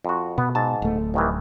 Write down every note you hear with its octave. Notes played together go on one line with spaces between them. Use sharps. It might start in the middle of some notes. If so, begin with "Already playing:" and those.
F2 F#4
B2 B3
G#2 A5
D1 A3
C2 D#3 E3